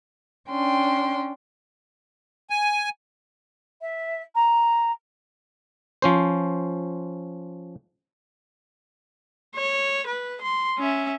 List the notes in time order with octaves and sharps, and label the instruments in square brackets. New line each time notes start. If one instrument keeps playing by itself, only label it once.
[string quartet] C#4 D4 G5 C6
[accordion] G#5
[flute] E5
A#5
[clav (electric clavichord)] F3 C#4 C5
[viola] C#5
B4
C6
C#4 E5